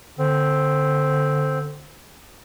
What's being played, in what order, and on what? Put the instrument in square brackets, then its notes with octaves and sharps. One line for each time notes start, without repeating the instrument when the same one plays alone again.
[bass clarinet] D3 [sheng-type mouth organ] C4